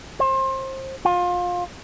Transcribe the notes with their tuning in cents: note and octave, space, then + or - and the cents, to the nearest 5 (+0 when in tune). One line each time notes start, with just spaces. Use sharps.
C5 +30
F4 +25